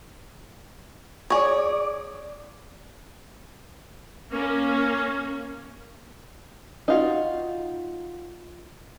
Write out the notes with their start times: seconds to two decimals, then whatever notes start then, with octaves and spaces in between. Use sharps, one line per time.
1.30 G#4 C#5 D5
4.32 A#3 C#4
6.88 D#4 F4 F#4